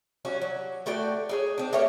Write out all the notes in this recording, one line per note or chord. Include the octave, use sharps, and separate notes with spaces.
G3 C#4 F#4
F#3
A3 F#4 D5 G5
D#4 G#4 C#5
C4 D4
A3 A#3 G4 C#5